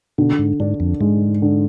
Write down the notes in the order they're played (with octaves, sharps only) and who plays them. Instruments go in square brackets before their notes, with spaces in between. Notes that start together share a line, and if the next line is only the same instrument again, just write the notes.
[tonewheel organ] B2 [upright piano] D3
[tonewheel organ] G#2
[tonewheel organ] G#2 [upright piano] D4
[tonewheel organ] F2
[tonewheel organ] G#2 [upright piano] G#3
[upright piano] D3